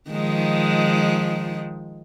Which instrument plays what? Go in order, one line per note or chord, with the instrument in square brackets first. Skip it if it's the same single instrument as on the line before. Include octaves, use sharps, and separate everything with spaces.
[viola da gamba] D#3 F3 G#3